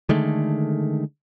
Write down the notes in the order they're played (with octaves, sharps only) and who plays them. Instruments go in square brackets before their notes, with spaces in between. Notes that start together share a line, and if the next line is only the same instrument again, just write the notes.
[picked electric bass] D3 D#3 G#3 A3